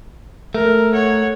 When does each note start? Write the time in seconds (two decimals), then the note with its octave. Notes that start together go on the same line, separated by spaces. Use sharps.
0.55 A3 A#4
0.93 C#5 F#5